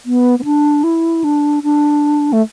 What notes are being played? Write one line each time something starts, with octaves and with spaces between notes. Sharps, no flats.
B3
B3
D4
E4
D4
D4
A3